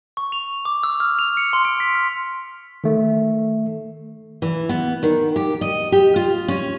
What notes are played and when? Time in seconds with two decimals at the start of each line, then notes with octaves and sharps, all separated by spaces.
0.17 C#6
0.32 F7
0.65 D6
0.83 E6
1.00 F6
1.19 F7
1.37 C#7
1.53 C6
1.65 D7
1.80 B6
1.95 F6
2.84 D#3 A3
4.42 E3
4.69 B3
5.03 D#3
5.36 G4
5.61 D#5
5.92 G4
6.16 F4
6.48 C#4